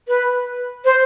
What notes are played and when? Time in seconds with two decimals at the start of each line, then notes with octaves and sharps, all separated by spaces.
0.08 B4
0.85 C5